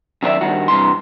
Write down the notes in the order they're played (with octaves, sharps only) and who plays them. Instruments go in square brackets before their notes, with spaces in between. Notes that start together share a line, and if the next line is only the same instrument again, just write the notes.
[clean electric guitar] F#2 D#3 D4 F#4 D5 E5
G2 D#3 F#4
G2 C3 E3 C6